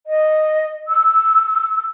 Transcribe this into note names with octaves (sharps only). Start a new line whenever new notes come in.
D#5
E6